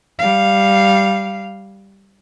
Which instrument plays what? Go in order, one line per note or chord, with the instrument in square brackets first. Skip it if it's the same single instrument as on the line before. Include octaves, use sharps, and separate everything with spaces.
[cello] G3 F5